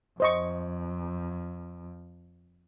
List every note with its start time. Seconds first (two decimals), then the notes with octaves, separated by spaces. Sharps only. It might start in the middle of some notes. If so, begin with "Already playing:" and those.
0.20 F2 C5 D#5 C#6